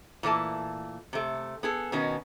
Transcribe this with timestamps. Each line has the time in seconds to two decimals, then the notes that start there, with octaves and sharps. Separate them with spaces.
0.23 A#2 E3 A3 A5
1.13 C3 A3
1.63 B3 G#4 A4
1.92 B2 D#3 B3 C#4 D#4